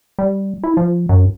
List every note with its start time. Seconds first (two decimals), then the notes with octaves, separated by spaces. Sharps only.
0.19 G3
0.63 E4
0.77 F3
1.09 F#2